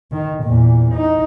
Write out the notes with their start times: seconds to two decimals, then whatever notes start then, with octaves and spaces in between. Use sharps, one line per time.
0.12 D#3
0.44 E2 A#2
0.94 D#4